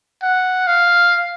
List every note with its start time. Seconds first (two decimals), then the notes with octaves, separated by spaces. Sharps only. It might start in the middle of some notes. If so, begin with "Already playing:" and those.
0.23 F#5
0.68 F5